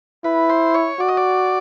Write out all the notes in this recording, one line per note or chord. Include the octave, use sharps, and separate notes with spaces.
E4 B4
C5
C#5
F#4 D5
D#5
D5